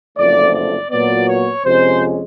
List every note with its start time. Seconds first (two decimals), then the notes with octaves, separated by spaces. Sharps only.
0.16 F#1 F2 D3 F3 A3 D5
0.53 D5
0.90 A#2 F#3 B3 D5
1.27 C#5
1.64 F2 C3 F3 G#3 C#4 C5